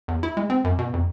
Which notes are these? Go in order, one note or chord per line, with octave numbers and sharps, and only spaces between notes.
E2
E4
G#3
C4
F#2
B2
F2